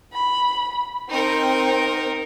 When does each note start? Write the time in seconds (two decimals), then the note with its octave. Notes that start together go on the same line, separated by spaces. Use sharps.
0.13 B5
1.09 C4 D#4 A#4